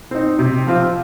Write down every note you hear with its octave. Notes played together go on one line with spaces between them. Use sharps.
C4 D#4
C3
F3 C4 F4